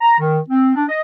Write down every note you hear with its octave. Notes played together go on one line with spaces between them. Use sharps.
A#5
D#3
C4
D4
D#5